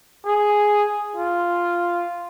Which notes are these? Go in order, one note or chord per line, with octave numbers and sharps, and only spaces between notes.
G#4
F4